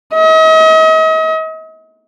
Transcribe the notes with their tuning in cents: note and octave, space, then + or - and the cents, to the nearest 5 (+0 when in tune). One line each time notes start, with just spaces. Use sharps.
D#5 +40